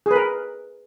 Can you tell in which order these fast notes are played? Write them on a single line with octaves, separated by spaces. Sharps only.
G#4 B4 A#4